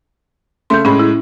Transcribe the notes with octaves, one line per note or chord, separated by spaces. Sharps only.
C#3 A3 C6 G6
A2 G#3 C#4 B5
E4